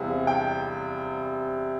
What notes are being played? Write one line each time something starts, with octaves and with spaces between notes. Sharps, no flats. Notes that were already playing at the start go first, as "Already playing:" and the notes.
Already playing: E2 C3 G3 F5
G5